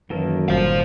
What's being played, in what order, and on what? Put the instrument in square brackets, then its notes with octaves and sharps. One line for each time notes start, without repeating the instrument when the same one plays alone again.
[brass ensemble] F#2 [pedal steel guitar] D#3 A#3 A4 [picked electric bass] E3
[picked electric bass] G1 A#2 G3 [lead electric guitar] C5 F5